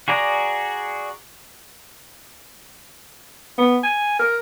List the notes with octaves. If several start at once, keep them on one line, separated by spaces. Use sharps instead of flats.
F#4 G#4 D5 A#5
B3
G#5
A#4